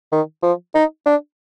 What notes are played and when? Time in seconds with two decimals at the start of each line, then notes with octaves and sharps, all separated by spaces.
0.12 D#3
0.43 F3
0.75 D#4
1.06 D4